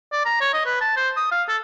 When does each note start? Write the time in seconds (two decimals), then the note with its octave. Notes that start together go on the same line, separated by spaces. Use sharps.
0.12 D5
0.25 A#5
0.41 C#5
0.54 D#5
0.66 B4
0.81 A5
0.96 C5
1.17 D#6
1.31 F5
1.48 A4